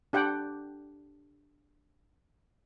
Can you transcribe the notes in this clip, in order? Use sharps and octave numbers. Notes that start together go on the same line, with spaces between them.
D4 G4 F#5 G5